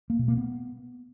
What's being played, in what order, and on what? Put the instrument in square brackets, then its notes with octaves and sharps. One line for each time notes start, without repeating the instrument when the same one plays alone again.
[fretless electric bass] A#3
B2
A#3
B3